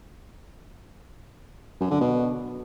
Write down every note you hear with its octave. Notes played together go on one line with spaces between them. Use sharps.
F#2
D3
B2